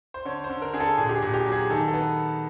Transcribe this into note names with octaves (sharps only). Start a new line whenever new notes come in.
C5
D3 C#5
C5
D3
A#4
D3 G#4
A4
A#2 G#4
G4
G#4
A#2
G4
F#3
G#4
D#3 A4
A4
B3